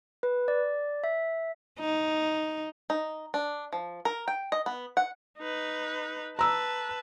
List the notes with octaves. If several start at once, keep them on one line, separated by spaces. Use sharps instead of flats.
B4
D5
E5
D#4
D#4
D4
F3
A#4
G5
D#5
B3
F#5
D#4 B4
B4 A5 A#5 E6